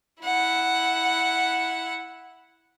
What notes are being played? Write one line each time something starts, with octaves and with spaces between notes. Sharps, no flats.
E4 F#5